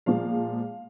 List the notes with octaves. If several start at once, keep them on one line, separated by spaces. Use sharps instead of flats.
A#2 F3 G#3 F5